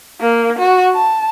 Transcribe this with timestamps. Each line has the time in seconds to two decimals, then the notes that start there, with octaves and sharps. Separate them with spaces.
0.21 A#3
0.59 F#4
0.95 A5